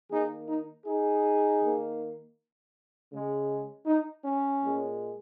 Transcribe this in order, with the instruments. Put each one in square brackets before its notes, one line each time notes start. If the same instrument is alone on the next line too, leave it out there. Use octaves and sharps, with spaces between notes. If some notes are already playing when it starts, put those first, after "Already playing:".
[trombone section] D#3 A#3 D#4 G#4
D#4
D#4 G#4
D#3 A#3
C#3 G#3
D#4
C#4
A#2 G#3